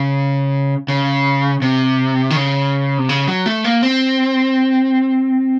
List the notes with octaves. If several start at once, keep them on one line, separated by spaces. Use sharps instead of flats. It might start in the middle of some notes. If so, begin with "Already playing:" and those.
Already playing: C#3
C#3
C3
D#3
C#3
C3
C#3
F#3
A3
A#3
C4